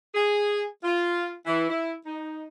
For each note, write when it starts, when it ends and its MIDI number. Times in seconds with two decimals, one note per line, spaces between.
0.15 0.63 68
0.83 1.32 65
1.46 1.68 52
1.70 1.94 64
2.06 2.45 63